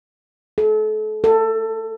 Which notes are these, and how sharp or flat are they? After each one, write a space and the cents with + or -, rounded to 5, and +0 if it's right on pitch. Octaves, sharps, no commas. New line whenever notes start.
A4 -35
A4 +20